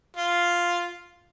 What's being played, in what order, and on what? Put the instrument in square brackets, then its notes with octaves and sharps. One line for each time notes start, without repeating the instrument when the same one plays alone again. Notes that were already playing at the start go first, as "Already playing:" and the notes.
[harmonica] F4